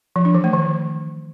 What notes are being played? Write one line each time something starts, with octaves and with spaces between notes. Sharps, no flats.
F3
D4
E3
A3
D#3